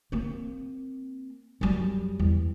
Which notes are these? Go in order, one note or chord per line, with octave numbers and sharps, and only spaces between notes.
A#3 C4
F#2 G3
E2